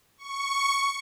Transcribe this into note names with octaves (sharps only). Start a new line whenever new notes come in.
C#6